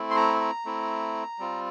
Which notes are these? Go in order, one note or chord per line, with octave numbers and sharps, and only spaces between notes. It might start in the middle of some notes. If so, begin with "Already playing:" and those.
Already playing: A3 C4 E4
C6
A#5
A#5
A3 C4 E4
G3 C4 F4